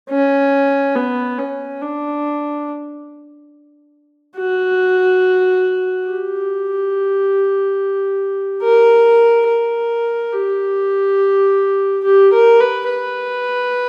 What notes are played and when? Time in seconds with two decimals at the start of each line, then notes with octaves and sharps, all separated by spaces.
0.10 C#4
0.95 B3
1.39 C#4
1.81 D4
4.37 F#4
6.07 G4
8.63 A#4
9.47 A#4
10.33 G4
12.04 G4
12.33 A#4
12.60 B4
12.89 B4